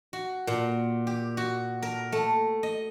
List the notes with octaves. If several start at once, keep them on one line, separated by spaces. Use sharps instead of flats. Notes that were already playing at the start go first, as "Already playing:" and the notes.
F#4
A#2
G4
F#4
A#4
A3
D#5